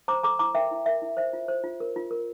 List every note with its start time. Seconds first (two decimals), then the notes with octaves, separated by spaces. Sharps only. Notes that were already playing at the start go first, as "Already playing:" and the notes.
0.08 C5 A#5 D6
0.23 A4 A#5 D6
0.39 E4 A#5 D6
0.54 A#4 E5 G5
0.71 E4
0.86 A#4 E5
1.02 E4
1.17 C5 E5
1.33 F4
1.48 C5
1.64 F4
1.80 A#4
1.96 F4
2.11 A#4